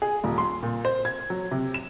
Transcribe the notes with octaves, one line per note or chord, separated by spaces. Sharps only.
G#4
D#1
C6
A#2
C5
G#6
F#3
C3
E7